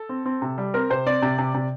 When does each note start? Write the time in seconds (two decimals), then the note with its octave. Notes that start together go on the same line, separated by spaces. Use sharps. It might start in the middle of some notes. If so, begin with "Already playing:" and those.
Already playing: A4
0.09 C4
0.26 C4
0.42 C3
0.58 G3
0.74 C4 A#4
0.90 C3 C5
1.06 C4 D5
1.22 C3
1.38 C3
1.54 C3